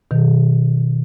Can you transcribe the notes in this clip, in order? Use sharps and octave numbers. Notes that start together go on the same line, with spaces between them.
B2 D#3